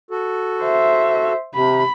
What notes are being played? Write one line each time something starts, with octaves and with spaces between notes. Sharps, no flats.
F#4 A4
C5 E5
C3 B5